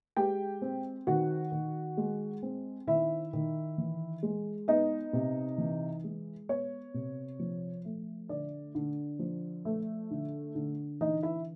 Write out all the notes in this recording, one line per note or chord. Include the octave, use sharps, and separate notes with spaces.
G#3 G4 G5
C4
D#3 F#4 F#5
D#3
G#3
C4
D#3 E4 E5
D#3
E3
G#3
B3 D#4 D#5
C3
E3
G#3
B3 C#5
C3
F3
A3
D3 D5
D3
F3
A3
D3
D3
E3 D#4 D#5
E4 E5